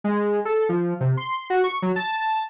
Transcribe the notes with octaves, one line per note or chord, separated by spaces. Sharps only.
G#3
A4
F3
C3
C6
F#4
C#6
F#3
A5